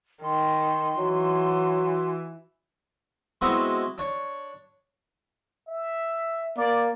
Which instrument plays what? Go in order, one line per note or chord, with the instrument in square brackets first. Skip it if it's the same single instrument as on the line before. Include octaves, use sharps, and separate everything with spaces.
[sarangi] D#3 [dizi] C6
[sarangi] E3 [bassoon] F#3 [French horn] F#4
[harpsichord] G#3 B3 C4 E4 F#4
D4 C#5
[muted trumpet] E5
[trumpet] A#3 [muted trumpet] D5